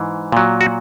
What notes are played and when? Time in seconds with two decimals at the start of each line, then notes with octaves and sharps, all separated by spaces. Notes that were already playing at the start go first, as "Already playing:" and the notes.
Already playing: G#2 E3
0.32 A#2 F#3
0.61 F#4